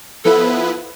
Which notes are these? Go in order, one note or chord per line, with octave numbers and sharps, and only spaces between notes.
F3 B3 E4 A4 B4